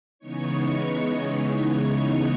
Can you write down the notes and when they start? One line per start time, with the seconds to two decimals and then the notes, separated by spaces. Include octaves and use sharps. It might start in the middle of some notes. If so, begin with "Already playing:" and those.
0.19 C#3 E3 G#3 B3 D#4 C#5 C#6
0.88 C#5 C#6